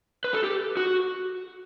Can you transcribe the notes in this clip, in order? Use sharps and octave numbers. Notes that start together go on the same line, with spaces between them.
B4
A4
G4
F#4